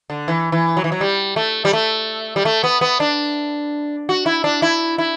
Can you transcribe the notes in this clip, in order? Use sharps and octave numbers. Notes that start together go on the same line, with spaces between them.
D3
E3
E3
F#3
E3
F#3
G3
A3
G3
A3
G3
A3
B3
B3
D4
F#4
E4
D4
E4
E4